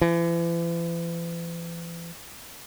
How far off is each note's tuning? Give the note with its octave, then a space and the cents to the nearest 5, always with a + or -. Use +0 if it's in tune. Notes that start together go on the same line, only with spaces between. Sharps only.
E3 +40